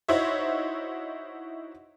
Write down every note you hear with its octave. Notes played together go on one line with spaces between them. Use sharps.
D#4 E4 F#4 C5 C#5 E5